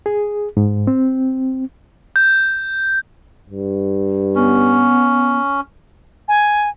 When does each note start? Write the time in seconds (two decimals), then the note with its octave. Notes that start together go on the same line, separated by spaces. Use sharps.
0.06 G#4
0.57 G#2
0.87 C4
2.16 G6
3.50 G2
4.35 B3 C#4
6.28 G#5